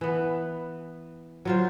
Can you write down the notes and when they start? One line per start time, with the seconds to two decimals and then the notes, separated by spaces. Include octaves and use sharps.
0.01 E3 B3
1.45 F#3 F4 C5